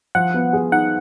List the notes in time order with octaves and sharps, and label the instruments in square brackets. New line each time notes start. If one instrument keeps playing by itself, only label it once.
[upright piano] F3 [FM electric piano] F#5
[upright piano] B3
G#4
[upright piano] D#4 [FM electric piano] F#5